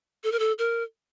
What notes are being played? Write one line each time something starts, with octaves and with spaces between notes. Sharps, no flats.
A4
A#4
A4
A#4